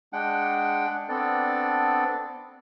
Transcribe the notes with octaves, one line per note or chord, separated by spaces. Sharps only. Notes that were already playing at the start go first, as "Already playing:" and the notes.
G#3 D4 F#5 G5
B3 C4 D4 A4 D5